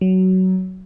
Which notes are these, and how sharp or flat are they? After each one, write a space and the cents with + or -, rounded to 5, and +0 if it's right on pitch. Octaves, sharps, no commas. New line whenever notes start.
F#3 +15